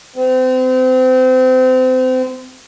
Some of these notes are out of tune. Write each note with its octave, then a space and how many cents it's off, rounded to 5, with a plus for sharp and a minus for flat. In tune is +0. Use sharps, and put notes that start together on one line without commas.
C4 -30